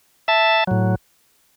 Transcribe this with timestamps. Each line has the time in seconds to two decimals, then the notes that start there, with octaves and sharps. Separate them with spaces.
0.28 E5 A5
0.67 A2 F#3